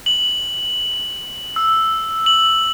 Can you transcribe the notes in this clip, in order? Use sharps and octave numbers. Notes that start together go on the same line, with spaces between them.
F#7
E6
F#7